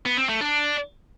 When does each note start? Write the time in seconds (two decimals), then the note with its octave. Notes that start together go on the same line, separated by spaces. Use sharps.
0.05 B3
0.17 C4
0.29 A3
0.41 D4